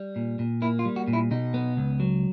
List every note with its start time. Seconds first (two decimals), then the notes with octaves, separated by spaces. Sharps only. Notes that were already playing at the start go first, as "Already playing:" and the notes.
Already playing: G3
0.16 A#2
0.39 A#2
0.62 A#3 E4
0.79 F4
0.85 G3
0.96 F#4
1.08 A#2
1.13 E4
1.31 B2 D#4
1.54 B3
1.77 C#2
2.00 F#3